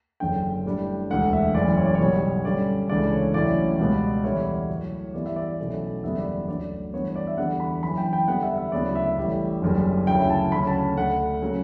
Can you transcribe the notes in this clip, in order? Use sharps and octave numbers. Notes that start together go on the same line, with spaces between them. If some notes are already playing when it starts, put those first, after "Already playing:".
F#1 F#2 D3 G5
A2 G3 D4
E1 D2 D3 A3 F#5
E5
F#1 F#2 E3 D5
C#5
D5
C#5
B1 B2 G3
G2 D3 G3 C#4 D5
C#2 C#3 E3 A3 D4 D5
C#5
A1 A2 F#3 C#4 E4 D5
C#2 B2 G3 B3
E2 D3 G3 B3 E4 C#5
A2 F#3 A3
G2 E3 G3 B3 E4 D5
E5
D5
B1 B2 A3 C#4 E4
F#1 E2 D3 G3 B3 E5
D5
D2 D3 F#3 D5
G2 E3 B3 D4 C#5
C#5
D5
E5
E2 D3 G3 B3 D4 F#5
B5
F#1 F#2 E3 B5
G5
G5
E2 D3 G3 B3 F#5
E5
E5
D2 C#3 F#3 B3 E4 D5
E5
A1 A2 G3
F#1 F#2 D3 G3
D2 C#3 F#3 C#4 E4 G5
A5
D2 C#3 F#3 C#4 B5
A5
D2 D3 A3 F#5
C#3 F#3 C#4